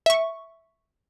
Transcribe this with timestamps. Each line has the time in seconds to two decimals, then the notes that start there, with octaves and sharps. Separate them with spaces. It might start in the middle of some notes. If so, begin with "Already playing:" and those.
0.06 E5 C#6